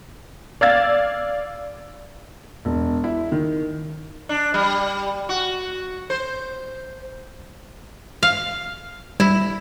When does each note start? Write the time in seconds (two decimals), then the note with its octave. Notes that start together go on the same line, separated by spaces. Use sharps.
0.61 D5 F5 E6 G#6 A6
2.65 E1
3.04 E4
3.32 D#3
4.29 D4
4.54 G3
5.29 F#4
6.10 C5
8.23 F5
9.20 G3 E4